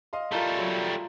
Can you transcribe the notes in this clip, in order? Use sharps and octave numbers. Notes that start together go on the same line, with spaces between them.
D#5 F5 C6
G3 A3 F4 A#4 A5
F#3